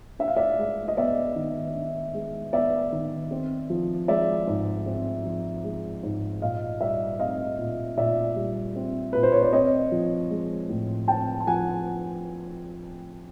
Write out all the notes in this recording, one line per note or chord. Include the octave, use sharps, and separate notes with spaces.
D4 E5
F5
D5 E5
G#3
D#5
B3 D5 E5
D#3
D4
G#3
B3 D5 E5
D#3
C4
F3
G#3 D5 E5
G#2
C4
F3
G#3
G#2
A#2 D#5 F5
G3 D5 E5
C4 D#5 F5
A#2
A#2 D5 E5
G3
C4
A#2 B4
C5
C#5
D5
C4 C#5 D#5
F3
G#3
A2
C4 G5 A5
A5
F3 F#5 G#5